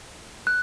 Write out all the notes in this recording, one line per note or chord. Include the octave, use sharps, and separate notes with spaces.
F#6